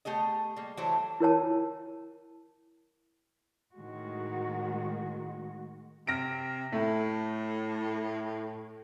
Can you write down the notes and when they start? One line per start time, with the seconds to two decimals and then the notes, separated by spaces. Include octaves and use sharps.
0.05 A3 G4 G#4 D#5
0.56 G3 A#3
0.77 E3 F#3 A3 G4 A4 C5
1.20 E4 A#4 C#5 A5
3.76 A2 D#3 G#3 F#4
6.07 C3 F6 A#6 D7
6.72 A2 A3